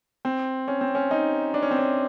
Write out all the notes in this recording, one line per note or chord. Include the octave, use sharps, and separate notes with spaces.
C4
C#4
C4
C#4
D#4
D4
C#4
C4
C#4